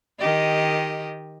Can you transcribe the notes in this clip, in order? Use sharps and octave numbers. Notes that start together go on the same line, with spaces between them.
D#3 G4 D#5